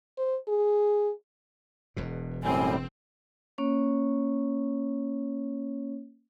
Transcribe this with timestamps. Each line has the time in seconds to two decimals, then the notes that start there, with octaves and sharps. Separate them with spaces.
0.18 C5
0.48 G#4
1.96 E1 E2 B2
2.44 F#2 A2 G3 C4 G#5
3.58 A#3 C#4 C#5